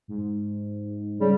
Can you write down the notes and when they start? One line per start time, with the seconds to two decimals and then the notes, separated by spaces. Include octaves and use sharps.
0.08 G#2
1.20 C#3 G3